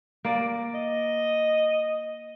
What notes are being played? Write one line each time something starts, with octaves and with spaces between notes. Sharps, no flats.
A#3 D5
D#5